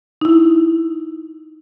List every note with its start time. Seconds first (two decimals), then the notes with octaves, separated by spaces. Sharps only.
0.21 D#4 E4